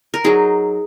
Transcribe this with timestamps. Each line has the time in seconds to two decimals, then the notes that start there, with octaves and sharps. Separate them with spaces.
0.14 A#4
0.24 F#3 D#4 G#4